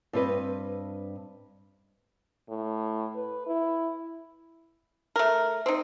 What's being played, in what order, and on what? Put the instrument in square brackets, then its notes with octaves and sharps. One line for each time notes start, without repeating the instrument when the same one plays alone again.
[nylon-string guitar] G2 C4 B4 D#5
[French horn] A2
B4
E4
[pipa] A3 A#4
C4 D#4